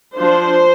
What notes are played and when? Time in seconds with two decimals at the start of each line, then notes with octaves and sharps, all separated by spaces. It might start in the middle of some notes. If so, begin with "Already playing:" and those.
0.17 F3 D4 C5